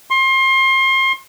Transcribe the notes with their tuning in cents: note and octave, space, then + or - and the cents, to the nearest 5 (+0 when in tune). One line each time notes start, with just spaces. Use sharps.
C6 +30